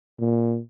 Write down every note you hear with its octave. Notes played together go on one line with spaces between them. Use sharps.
A#2